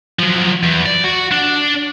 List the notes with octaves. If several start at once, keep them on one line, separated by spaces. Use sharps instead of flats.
F3 F#3
E2
D5
F#4
D4